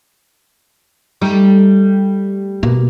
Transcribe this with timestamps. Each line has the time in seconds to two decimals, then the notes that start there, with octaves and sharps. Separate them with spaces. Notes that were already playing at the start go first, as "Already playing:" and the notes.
1.21 G3 A3 D#4
2.63 B2 A#3